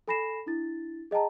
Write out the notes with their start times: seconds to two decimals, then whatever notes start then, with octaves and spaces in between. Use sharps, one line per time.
0.08 A4 G#5 B5 A#6 C7 E7
0.46 D4 E4 A6
1.11 G#4 D#5 G5 A5 A#5